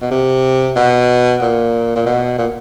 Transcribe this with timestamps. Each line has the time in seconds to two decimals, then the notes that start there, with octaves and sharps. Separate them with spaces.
0.02 B2
0.11 C3
0.76 B2
1.41 A#2
1.96 A#2
2.06 B2
2.38 A#2